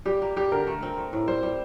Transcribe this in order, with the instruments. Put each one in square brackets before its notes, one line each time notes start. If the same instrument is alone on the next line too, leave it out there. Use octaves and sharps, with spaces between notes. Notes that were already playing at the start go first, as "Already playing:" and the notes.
[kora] G3 [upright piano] G4
[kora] A#3
[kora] G3 [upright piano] G4
[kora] D3 [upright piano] A#4
[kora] A3
C4
A3
A2
[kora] G3 [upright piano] C5
[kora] G3